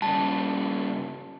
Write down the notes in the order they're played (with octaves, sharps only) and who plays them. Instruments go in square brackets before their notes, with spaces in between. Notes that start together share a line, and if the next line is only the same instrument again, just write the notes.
[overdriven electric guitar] G2 C#3 [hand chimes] A5